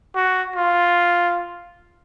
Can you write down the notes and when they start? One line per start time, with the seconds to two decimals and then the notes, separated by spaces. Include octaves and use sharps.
0.15 F#4
0.56 F4